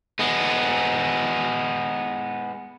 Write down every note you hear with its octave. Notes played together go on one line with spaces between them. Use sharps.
G#3 B3